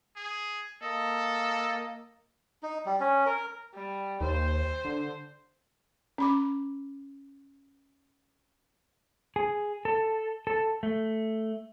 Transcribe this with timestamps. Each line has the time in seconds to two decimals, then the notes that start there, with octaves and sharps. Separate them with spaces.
0.16 G#4
0.83 A#3 A4 D#5
2.63 D#4
2.86 G3
3.00 C#4
3.26 A#4
3.74 G3
4.21 D#2 C5
4.85 D3
6.18 C#4 B5 D6
9.36 G#4
9.85 A4
10.47 A4
10.83 A3